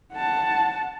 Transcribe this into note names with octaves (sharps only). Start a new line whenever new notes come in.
F#5 A5